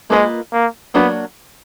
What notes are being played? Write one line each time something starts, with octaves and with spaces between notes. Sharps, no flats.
G#3 A#3 F4 B4 D#5
A#3
F#3 A#3 B3 D4 F#4